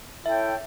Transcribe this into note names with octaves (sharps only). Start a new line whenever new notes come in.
E4 A4 C#5 E5 G5